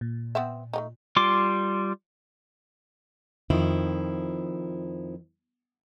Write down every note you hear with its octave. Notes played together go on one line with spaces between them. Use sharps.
A#2
B3 C4 E5
A3 A#3 D#4
G3 F4 C6 D6
F2 D#3 F3 E4